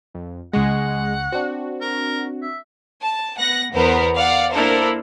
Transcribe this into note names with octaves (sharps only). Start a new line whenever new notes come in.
F2
C#2 G#3 F#5 C#6 A#6
C4 D4 F#4
A#4
E5
A5
B3 F#5 F#6 A#6
E2 B3 A#4 C5
D5 F5 F#5
A#3 D4 E4 A4 A#4 C5